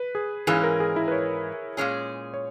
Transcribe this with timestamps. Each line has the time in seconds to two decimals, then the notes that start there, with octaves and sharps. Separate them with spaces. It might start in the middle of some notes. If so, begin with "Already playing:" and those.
Already playing: B4
0.15 G#4
0.47 G#2 E3 A#3 C#4 G#4
0.63 A#4
0.80 G#4
0.96 E4
1.08 B4
1.12 C#5
1.77 A#2 G#3 C#4 G#4
2.34 C#5